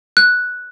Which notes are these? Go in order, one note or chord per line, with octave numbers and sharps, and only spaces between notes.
F#6